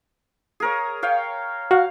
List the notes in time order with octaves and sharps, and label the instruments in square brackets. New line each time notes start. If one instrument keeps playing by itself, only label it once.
[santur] G#4 A#4 C#5
C#5 F5 G5
[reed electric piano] F#4 [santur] F5